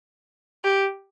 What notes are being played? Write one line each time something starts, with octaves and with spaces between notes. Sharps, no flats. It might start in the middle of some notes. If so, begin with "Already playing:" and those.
G4